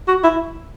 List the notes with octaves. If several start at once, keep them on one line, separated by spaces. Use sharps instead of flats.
F#4
E4